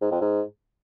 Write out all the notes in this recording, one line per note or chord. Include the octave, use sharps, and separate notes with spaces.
G#2
F2
G#2